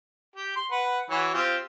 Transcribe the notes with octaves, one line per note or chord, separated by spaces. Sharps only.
G4
C6
B4 F#5
E3 F#4 C#5
C4 F4 G4